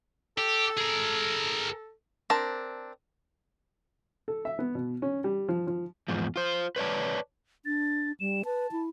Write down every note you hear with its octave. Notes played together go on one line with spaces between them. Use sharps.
G4 A4
G#4 A#4
C4 D4 A#4 A5
A4
E5
B3
B2
C#4
G3
F3
F3
E2 G#2 F3
F4 C5
B4 C#5 D5 A5
D4 A6
G3 E7
B4 A5
E4